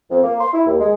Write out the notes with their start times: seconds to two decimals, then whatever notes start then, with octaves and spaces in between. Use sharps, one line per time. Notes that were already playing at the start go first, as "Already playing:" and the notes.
0.10 F2
0.22 A#3
0.40 C6
0.53 E4
0.66 D#2
0.80 G#3